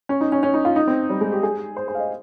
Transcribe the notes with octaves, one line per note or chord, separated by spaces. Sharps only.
C#4
D#4
C#4
C#4
D#4
F4
D#4
C4
G3
G#3
G4
G#4
C5
C5
F5
D#5